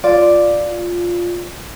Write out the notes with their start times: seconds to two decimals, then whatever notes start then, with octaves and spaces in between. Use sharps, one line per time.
0.04 F4 D5